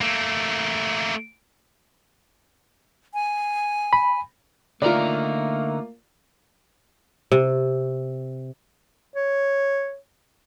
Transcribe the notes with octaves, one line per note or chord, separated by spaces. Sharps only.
A3 A#3
G#5
B5
D3 A3 A#3 D#4 F4 A#4 D5
C3
C#5